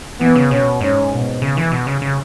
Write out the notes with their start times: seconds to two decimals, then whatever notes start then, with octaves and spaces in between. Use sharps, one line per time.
0.20 E3 B3
0.36 C#3
0.50 B2 C#4
0.80 G#2 C#4
1.11 B2
1.42 C#3
1.57 E3
1.72 B2
1.87 C#3
2.02 C#3